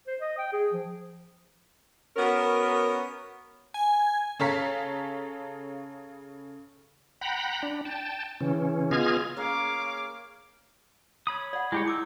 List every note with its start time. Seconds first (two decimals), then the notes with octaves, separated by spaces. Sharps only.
0.07 C5
0.21 D#5
0.38 G5
0.53 G#4
0.73 F3
2.16 B3 C#4 F#4 A#4
3.74 G#5
4.39 C#3 A4 C#5 F5 A#5 B6
7.21 F#5 G5 A#5 B5
7.63 D4
7.85 G5 A5
8.41 C#3 E3 C#4
8.91 B3 F4 G#4 D#5 F6 G#6
9.37 A#3 C#4 G#4 F5 D6
11.27 C#5 B5 D#6
11.53 D5 F#5
11.72 G#3 E4 G4 G#4 C#5 D#5
11.86 D#4 E4 D6 E6